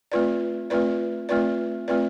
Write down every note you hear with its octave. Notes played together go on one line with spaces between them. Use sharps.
A3 C4 F4 B4 D5
A3 C4 F4 B4 D5
A3 C4 F4 B4 D5
A3 C4 F4 B4 D5